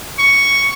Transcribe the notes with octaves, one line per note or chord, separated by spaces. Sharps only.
C#6